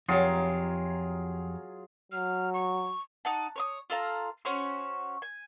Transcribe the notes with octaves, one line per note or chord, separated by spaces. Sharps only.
F2 F#3 F4 G4 G#4
F#3 F6
C#6
D#4 F#5 A5
C#5 C#6 D#6
F4 A4 F5 A#5
C#4 F#4 C5 C#5
G#5